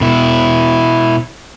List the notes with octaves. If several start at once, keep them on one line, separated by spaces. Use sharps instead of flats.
B2 E4